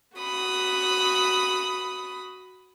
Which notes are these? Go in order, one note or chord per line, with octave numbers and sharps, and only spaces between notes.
F#4 B5 D#6